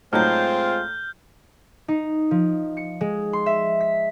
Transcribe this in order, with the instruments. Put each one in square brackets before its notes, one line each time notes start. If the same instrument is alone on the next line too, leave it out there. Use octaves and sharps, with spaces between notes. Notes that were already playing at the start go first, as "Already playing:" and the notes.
[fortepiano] A2 F#3 D#4 [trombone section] G#3 F4 [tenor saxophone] C4 [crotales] F6 G6
[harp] D#4
F3
C#7
G#3
C6
E5
B6